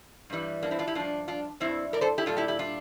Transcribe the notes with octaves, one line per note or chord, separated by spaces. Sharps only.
G2 E3 G3
A#3 D4
C4 E4
D4 F4
E4 G4
G2 F3 D4 F4
D4 F4
G2 D3 G3 C4 E4
A#4 D5
A4 C5
E4 G4
A#2 G3 F4 A4
E4 G4
E4 G4
D4 F4